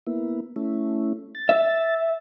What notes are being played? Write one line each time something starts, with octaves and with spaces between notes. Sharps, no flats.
A#3 B3 E4
A3 C#4 E4
A6
E5